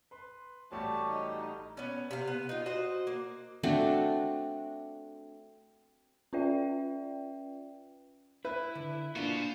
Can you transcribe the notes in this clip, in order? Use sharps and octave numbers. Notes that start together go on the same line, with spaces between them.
B4 C6
A1 G3 A3 F#4 G4 C#5 A5
D#4
B3 C#4
C3 F5
B3
D#4 F4
F#4 C5 D#5
A#3
A3 C4 D4 F#4
C#4 F4 B4 D5 E5 G5
E4 B4 E5
D3
A#3 B3 D4 F4 F#4
C5